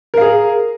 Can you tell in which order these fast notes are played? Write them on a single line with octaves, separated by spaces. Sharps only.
A#4 F5 G#4